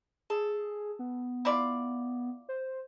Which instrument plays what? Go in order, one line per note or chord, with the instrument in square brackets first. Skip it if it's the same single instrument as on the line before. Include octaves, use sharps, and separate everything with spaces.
[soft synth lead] G#4 [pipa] A4
[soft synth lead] B3
[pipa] E4 F4 D5
[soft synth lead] C5